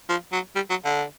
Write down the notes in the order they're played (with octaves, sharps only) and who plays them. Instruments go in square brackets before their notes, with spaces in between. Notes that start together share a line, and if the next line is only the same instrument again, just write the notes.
[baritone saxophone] F3
F#3
G3
F#3
D3